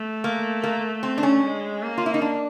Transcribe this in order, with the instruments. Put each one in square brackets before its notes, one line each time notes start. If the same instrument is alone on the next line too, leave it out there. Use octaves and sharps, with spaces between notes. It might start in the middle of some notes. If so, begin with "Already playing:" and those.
Already playing: [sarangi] A3
[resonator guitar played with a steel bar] A#3
A#3
C4
D4
C#4
[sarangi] G#3
A#3
[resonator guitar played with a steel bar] F4
E4
D#4
D4